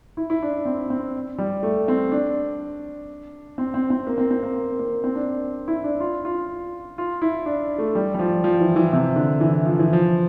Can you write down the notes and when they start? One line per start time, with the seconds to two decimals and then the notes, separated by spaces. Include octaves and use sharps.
0.17 E4
0.30 E4
0.42 D4
0.66 C4
0.90 C4
1.38 G3
1.63 A3
1.88 C4
2.12 D4
3.58 C4
3.74 C4
3.90 C4
4.07 A#3
4.18 C4
4.31 C4
4.43 A#3
4.79 A#3
5.04 C4
5.15 D4
5.68 E4
5.84 D4
6.00 F4
6.25 F4
6.98 F4
7.22 E4
7.46 D4
7.78 A3
7.95 G3
8.14 G3
8.19 F3
8.44 F3
8.60 E3
8.76 E3
8.93 C3
9.16 D3
9.41 E3
9.65 F3
9.79 E3
9.93 F3